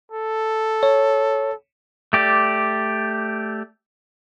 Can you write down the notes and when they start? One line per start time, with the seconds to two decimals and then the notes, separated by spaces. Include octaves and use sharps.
0.12 A4
0.83 C#5
2.13 A3 G4 D5